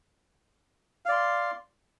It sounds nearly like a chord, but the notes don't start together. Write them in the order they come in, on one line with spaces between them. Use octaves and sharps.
F5 D5 C6